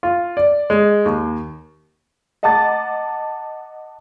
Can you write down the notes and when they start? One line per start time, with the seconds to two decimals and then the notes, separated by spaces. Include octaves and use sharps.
0.03 F4
0.37 D5
0.70 G#3
1.05 D#2
2.43 D#5 F#5 A5 A#5 D6 A6